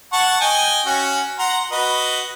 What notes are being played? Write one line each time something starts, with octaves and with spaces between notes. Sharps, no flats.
F#5 A5 C#6
D#5 G5 G#5
C#4 F#4
F#5 A#5 C6
F#4 B4 D#5